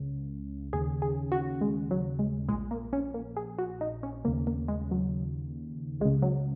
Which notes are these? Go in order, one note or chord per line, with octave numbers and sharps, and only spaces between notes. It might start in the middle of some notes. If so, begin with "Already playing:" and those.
Already playing: C#2 C#3
D#2 C#3 G#4
G#4
F#4
G#3
F#3
G#3
A#1 A#2 G#3
A#3
C#4
A#3
G#4
F#4
D#4
C#4
D#2 C#3 A#3
A#3
G#3
F#3
C#2 G#3
C#3
F#3